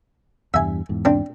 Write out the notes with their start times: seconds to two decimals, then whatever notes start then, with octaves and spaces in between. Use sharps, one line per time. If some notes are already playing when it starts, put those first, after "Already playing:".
0.54 E2 G2 G3 E5 G#5
0.89 E2 G#2
1.05 C4 D4